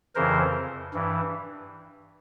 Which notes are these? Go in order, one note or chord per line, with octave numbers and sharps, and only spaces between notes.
F2 C#3 E3 A#4 C5
G2 E3